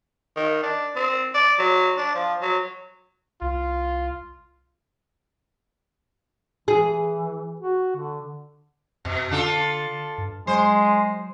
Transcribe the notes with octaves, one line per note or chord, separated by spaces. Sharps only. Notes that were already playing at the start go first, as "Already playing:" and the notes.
D#3
D4
C4
D5
F#3
D4
F3
F#3
C2 F4
E3 G#4
F#4
D3
F2 B2
D3 D4 F4 A4
G2
F#3 G#3 C5